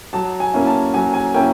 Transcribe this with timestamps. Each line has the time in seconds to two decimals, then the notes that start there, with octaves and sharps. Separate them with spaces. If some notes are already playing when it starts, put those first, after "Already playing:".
0.13 F#3 A5
0.40 G#5
0.54 A#3 C#4 E4
0.67 A5
0.94 F#3 G#5
1.14 G#5
1.34 A#3 C#4 E4 G5